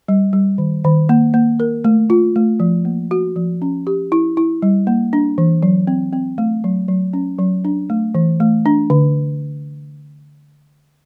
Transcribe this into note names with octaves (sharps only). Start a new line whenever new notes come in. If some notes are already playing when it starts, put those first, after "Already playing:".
G3
G3
D#3
D#3
A#3
A#3
A#4
A3
F4
A3
F3
A#3
F#4
F3
C#4
G4
E4
E4
G3
A#3
D4
E3
F#3
C4
C4
A3
F#3
F#3
C#4
F#3
D4
A3
E3
A3
D4
D3